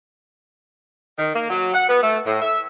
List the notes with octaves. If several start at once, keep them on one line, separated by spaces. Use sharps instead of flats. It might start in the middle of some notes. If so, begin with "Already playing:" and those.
D#3
A#3
F#3
F#5
B3
A3
A2
E5